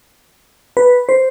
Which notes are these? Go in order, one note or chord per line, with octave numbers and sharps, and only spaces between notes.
B4
C5